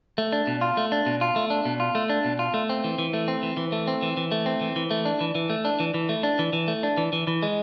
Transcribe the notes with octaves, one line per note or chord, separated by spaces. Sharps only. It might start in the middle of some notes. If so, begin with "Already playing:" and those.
A3
D4
B2
F4
A3
D4
B2
F4
A3
D4
B2
F4
A3
D4
B2
F4
A3
C4
E3
E3
A3
C4
E3
E3
A3
C4
E3
E3
A3
C4
E3
E3
A3
D4
E3
E3
A3
D4
E3
E3
A3
D4
E3
E3
A3
D4
E3
E3
E3
G#3